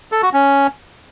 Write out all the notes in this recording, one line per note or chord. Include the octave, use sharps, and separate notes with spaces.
A4
F#4
C#4